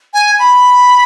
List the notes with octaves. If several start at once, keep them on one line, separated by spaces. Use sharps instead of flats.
G#5
B5